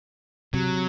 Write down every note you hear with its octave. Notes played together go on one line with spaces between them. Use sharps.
C3 F#3